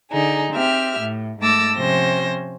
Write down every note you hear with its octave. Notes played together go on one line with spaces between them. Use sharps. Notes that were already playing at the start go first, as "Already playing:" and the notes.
D3 D#4 G#4
C4 G4 E5 F6
A2
G#2 A3 A5 D6 E6 A#6
C3 F3 C#4 C5 A#6